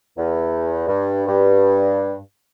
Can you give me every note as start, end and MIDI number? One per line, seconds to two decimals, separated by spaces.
0.18 0.86 40
0.87 1.23 43
1.27 2.16 43